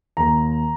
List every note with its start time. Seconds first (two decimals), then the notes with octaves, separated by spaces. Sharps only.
0.17 D#2 A#5